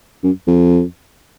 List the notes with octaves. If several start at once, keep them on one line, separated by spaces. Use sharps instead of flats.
F#2
F2